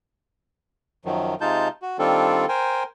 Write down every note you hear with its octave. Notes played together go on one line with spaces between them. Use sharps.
F#2 D#3 F3 F#3
C3 G#3 D#4 F4 A5 G6
F#4
D#3 G3 C4 D4 F4 A4
A#4 C5 G5 G#5